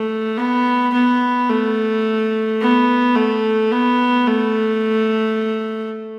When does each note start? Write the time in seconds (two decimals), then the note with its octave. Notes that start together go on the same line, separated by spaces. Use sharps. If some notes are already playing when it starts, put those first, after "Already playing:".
Already playing: A3
0.37 B3
0.93 B3
1.49 A3
2.61 B3
3.15 A3
3.71 B3
4.27 A3